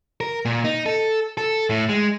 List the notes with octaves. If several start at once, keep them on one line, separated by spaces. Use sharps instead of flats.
A#4
A#2
D#4
A4
A4
A2
G#3